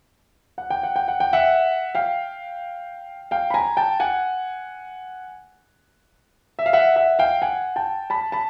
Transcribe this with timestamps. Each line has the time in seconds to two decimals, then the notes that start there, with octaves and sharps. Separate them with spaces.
0.58 F#5
0.70 G5
0.83 F#5
0.96 G5
1.08 F#5
1.20 G5
1.33 E5 F#5
1.95 F5 G5
3.31 F5 G5
3.50 B5
3.54 G#5 A#5
3.77 G5 A5
4.00 F#5 G#5
6.59 E5
6.66 F5
6.73 E5 F#5
6.96 E5 F#5
7.19 F5 G5
7.42 F#5 G#5
7.76 G5 A5
8.10 A5 B5
8.32 A5 B5